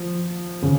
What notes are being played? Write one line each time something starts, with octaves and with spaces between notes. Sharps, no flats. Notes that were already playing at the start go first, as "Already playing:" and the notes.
Already playing: F3
C#3